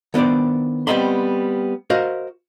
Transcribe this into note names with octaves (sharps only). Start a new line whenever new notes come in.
D#3 B3 D4 C5 D5
G3 B3 C4 D#5 B5 C6
F#4 A#4 C5 D#5 F5